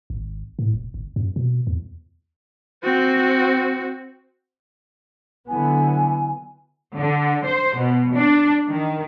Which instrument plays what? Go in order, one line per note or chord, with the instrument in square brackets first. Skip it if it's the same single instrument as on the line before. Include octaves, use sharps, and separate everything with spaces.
[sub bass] G#1
A2
E1
G1
F#2
B2
E2
[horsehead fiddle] C4 F#4
[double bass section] D3 F#3 B3 [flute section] E4 G#5
[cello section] D3
C5
B2
D4
D#3